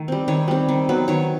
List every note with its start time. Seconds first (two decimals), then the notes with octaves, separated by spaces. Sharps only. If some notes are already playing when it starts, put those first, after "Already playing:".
Already playing: D#3 A3
0.08 G3 C4
0.28 D#3 C#5
0.48 G3 C4
0.69 D#3
0.89 F#3 B3
1.08 D#3 C#5